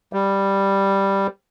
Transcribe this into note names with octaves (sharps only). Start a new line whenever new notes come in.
G3